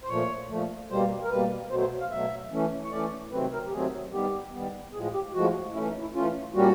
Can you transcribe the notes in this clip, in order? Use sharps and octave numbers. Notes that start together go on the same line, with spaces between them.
C5
A#2 F3 A3 C#5
A#2 F3 A3
B2 G3 A#3 C5
A#4
B2 G3 A#3 B4
B2 F#3 A3 C5
C5
F5
B2 F#3 A3 E5
E3 A3 C#4
C#5
E3 A3 C#4 D5
C3 D#3 F#3 A3 C4 B4
A#4
G4
C3 D#3 F#3 A3 C4 G#4
D#3 G3 B3 G4
D#3 G3 B3
A2 F3 G#3 G#4
G4
A2 F3 G#3 F#4
E3 A3 C#4 E4
D#4
E4
E3 A3 C#4 F4
A#2 G3 A#3 C#4 F#4